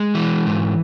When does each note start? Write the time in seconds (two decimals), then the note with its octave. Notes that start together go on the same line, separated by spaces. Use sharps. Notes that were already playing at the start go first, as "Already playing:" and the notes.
Already playing: G#3
0.15 E3
0.46 G#2